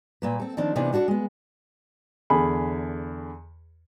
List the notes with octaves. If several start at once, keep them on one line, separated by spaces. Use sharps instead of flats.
A#2 A#3 B4
C4 A4
D#3 F3 A3 C4 D4
C3 E3 B3 D4 D#4
D4 F#4 A4 B4 D5
G#3 B3
E2 D3 G#4 B5